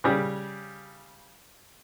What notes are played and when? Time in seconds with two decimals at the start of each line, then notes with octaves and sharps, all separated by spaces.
0.04 C#3 G3